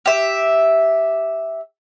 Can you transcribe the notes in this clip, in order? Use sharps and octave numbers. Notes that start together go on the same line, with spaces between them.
G4 E5